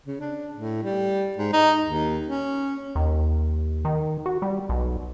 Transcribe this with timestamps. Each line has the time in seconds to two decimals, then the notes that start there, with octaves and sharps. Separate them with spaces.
0.06 C#3
0.20 D4
0.54 A2
0.83 G3
1.37 G#2
1.53 D#4
1.85 D#2
2.27 C#4
2.96 D#2
3.85 D#3
4.26 F#4
4.42 G3
4.69 B1